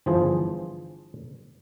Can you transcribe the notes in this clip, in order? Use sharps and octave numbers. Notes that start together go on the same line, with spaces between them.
G1 E3 F3 G#4 C5